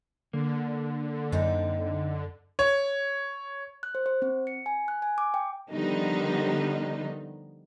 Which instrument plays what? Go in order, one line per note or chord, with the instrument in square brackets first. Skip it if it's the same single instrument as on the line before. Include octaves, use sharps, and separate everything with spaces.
[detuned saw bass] D3 [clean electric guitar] A#3
[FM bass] F#2 [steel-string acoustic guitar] C4 D#4
[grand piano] C#5
[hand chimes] F#6
C5
C5
C4
C#7
G#5
F#6
G#5
D6
G5
[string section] D3 D#3 F3 G3 B3 D#4